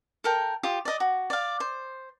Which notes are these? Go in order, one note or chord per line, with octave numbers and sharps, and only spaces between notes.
A4 A#4 G5
F4 G4 D#6
D5 D#5
F#4
D5 F5
C5